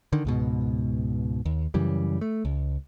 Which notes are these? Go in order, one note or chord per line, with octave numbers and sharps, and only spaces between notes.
D3 D#3
C#2 G#2 B2
D#2
F#2 C#3 E3 G3
A3
C#2